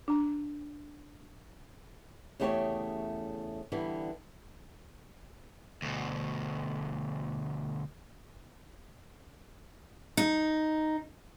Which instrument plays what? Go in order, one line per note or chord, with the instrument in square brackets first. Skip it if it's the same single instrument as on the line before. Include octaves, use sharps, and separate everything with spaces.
[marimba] D4 A#5
[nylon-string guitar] E2 C#3 A3 G4 C5 C#5
D3 E3 G3 B3
[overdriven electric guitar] D2 B2
[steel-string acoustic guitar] D#4